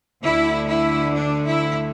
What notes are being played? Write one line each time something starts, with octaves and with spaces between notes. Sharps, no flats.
D2 D3 E4
E4
D4
E4